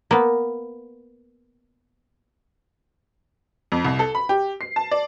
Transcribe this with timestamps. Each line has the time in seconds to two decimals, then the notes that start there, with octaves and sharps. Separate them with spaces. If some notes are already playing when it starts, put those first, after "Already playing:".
0.11 A#3 B3
3.72 F2
3.84 C2
3.99 A4
4.15 B5
4.29 G4
4.61 C7
4.76 A5
4.91 D5